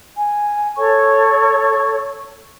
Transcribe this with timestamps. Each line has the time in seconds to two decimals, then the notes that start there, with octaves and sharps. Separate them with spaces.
0.17 G#5
0.76 A4 C#5 C#6